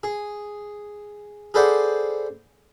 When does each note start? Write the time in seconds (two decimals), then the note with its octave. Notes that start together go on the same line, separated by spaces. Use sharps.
0.03 G#4
1.54 G#4 A4 B4 C5 D5 F#5